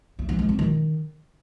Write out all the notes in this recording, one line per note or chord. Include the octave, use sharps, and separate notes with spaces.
A3
E3
G#3
C4
D#3